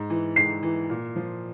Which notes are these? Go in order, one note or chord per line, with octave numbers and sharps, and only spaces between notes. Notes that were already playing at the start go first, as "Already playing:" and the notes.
Already playing: G#2
E3
G#2 C7
E3
A#2
F3